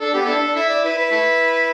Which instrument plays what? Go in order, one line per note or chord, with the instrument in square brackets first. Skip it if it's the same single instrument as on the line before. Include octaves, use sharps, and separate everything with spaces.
[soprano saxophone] D4 [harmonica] A4
[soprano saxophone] B3 [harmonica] G4
[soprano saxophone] D4 [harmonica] E4 A4
[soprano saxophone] D4
[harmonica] E4 [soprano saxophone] E5
[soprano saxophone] D5
[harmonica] E4 [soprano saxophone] B4
[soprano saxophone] B4
[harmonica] A3 E4